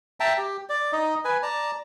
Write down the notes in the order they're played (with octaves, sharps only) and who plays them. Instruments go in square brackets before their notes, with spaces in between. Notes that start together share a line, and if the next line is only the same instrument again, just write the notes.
[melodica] E5 G5 A5 A#5
G4
D5
D#4 D#5
B4 G#5
D5 A5 A#5